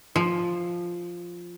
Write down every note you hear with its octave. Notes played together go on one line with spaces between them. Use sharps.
F3